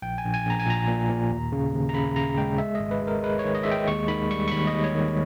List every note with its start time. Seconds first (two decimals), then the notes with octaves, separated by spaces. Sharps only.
0.02 A#1 G5
0.18 G#5
0.24 A#1
0.34 G#5
0.45 A#1 A#5
0.59 G#5
0.66 A#2 A#5
0.88 A#2
1.09 A#2
1.30 D#2
1.52 C#3
1.73 D#2
1.89 A#5
1.94 C#3 B5
2.16 C#3 A#5
2.38 G#3 G5
2.58 G#3 E5
2.75 G#1 D#5
2.91 B4
3.02 G#3
3.07 A#4
3.23 G#3 B4
3.39 C#5
3.44 D#3
3.55 D#5
3.63 G#3 E5
3.71 G5
3.87 D#2 C#6
4.08 D#3 B5
4.30 G3 C#6
4.48 C#6
4.52 D#2 B5
4.67 D#5
4.73 D#2
4.84 C#5
4.94 D#3